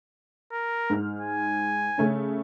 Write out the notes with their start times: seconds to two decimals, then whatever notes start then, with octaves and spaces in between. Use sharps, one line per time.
0.52 A#4
0.90 G#2 F6
1.21 G#5
1.98 C#3 A3 C#4